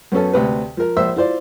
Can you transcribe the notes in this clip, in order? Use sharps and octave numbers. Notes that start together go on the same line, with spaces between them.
F#2 B3 C#4 A4
D2 C3 B4
F3 A#4
A#1 C5 E5 E6
E4 F4 C5 D5